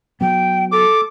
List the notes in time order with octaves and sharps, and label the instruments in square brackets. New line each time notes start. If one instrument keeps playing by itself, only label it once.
[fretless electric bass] F#3 B3 [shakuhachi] G5
[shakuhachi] A4 [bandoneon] D6